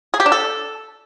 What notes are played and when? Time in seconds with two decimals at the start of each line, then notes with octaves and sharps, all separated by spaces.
0.14 G#4
0.20 G4
0.26 D4
0.32 A4